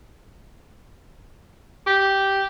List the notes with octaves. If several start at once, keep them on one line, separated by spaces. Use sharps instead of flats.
G4